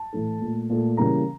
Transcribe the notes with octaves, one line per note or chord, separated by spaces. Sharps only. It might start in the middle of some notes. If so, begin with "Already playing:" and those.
Already playing: A5
A2 E3 A3
A#2 A3
A#2 A3
C#3 E3 G3 A#3 A#5